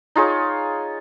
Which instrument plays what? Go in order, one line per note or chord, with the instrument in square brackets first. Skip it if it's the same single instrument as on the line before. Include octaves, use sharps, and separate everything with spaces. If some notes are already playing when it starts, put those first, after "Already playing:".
[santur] D#4 F4 G#4 C#5